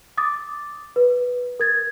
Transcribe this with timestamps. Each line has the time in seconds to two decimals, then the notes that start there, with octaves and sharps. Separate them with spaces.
0.17 D6 D#6 A6
0.96 B4
1.60 A#4 G#6 A6